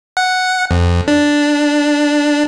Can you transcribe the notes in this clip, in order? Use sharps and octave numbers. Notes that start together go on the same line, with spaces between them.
F#5
F2
D4